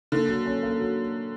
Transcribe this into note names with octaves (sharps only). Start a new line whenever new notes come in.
D3 A#3
F#3
C#4
A#3
F#3